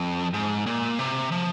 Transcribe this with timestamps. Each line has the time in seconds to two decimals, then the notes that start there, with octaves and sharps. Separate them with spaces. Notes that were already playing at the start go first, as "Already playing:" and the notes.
Already playing: F2
0.34 G#2
0.66 A#2
0.99 C3
1.32 F3